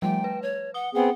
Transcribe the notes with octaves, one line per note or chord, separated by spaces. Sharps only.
F3 G3 A3 G5
B4
C#5
F#5 D#6 G7
B3 C4 G#4 F#5